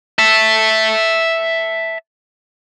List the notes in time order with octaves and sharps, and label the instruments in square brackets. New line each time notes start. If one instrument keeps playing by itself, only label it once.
[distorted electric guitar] E5 A5